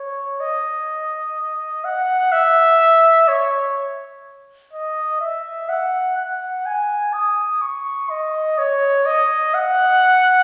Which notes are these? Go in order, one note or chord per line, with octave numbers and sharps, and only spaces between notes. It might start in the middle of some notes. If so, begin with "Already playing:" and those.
Already playing: C#5
D#5
F#5
E5
C#5
D#5
E5
F#5
F#5
G#5
D#6
C#6
D#5
C#5
D#5
F#5